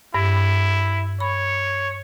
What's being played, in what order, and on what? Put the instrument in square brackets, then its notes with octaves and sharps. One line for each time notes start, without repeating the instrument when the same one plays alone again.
[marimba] G2 [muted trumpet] E4
[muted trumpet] C#5 [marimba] B5